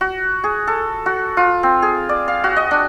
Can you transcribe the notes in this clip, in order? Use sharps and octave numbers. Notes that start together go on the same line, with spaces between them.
F#4
G#4
A4
F#4
F4
C4
G#4
D5
F5
F#4
D#5
D4